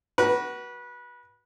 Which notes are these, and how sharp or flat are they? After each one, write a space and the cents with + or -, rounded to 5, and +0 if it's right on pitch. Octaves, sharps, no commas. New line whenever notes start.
F#4 +20 B4 -25